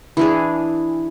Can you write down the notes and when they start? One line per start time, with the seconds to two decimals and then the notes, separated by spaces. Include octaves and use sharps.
0.17 E3 D4 G#4